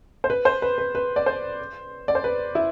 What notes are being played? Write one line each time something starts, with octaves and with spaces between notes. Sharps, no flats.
C5
B4
C5
B4
B4
B4
D5
C5
D5
C5
B4
E4